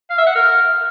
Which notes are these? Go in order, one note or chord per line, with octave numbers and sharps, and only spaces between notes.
F5
E5
F#5
A#4